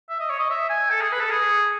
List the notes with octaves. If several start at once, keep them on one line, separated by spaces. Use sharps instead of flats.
E5
D#5
C#5
D#5
E5
G#5
A4
G#4
B4
A4
G#4